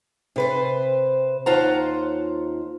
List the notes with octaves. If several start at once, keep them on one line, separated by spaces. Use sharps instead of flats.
C3 B4 C5
D#2 F4 C5 F#5 A5 A#5